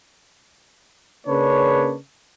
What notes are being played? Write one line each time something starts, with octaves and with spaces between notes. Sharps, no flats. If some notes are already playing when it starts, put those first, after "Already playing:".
C#3 A#3 C#4 D4 B4 C#5